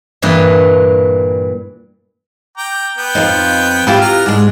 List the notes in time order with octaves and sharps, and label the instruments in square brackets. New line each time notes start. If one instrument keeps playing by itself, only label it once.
[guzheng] G2 A#2 E3 A#3 D#5
[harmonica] G5 A#5 D6
B3 G5
[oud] F2 F3 D#4
[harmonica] E3 G#3 [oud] E4 F4 G4
[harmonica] B3 A#5 F6
[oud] G#2 G#3 [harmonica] D4